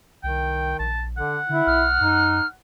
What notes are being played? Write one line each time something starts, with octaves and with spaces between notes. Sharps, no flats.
C2 D#3 G5
A#1 A5
D3 F#5
D3 E4
B1 F6
F#2 D#4